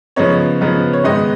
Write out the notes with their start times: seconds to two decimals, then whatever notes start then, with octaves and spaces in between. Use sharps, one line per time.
0.16 C#3 F3 B3 D#4 C#5
0.61 C#3 F3 B3 D#4
0.93 C#5
1.04 G#2 D#3 G#3 B3 D#4 D#5